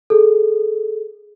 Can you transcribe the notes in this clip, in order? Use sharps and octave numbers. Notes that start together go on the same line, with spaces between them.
G#4 A4